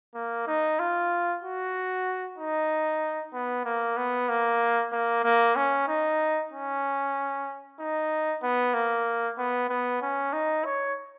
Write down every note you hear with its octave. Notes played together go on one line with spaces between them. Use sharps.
A#3
D#4
F4
F#4
D#4
B3
A#3
B3
A#3
A#3
A#3
C#4
D#4
C#4
D#4
B3
A#3
B3
B3
C#4
D#4
C#5